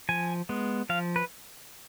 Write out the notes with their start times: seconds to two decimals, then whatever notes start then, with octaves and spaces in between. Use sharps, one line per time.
0.09 F3 G#5
0.49 G#3 B3
0.89 F3 F5
1.16 B4